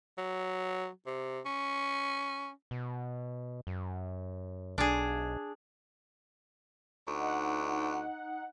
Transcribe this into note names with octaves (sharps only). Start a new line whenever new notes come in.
F#3
C3
C#4
B2
F#2
B1 D4 G#4
D2 D#4 F#5